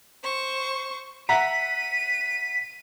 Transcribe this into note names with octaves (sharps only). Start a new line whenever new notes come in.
C5 C#6
E5 F#5 A#5 B6 D#7